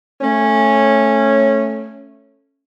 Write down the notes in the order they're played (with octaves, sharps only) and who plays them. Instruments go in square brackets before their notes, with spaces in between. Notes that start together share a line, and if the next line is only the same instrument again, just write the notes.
[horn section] A3 C#4